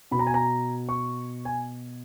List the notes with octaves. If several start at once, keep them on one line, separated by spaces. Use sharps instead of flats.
B2 B5
A#5
G#5
A#5
C#6
G#5